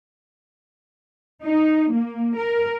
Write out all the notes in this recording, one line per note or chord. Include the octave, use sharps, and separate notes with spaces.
D#4
A#3
A#4